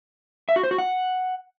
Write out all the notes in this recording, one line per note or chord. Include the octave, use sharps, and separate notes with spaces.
E5
F#4
C5
F#4
F#5